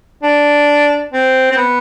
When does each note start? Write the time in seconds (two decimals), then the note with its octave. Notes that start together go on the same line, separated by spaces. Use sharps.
0.23 D4
1.12 C4
1.52 C4
1.57 B3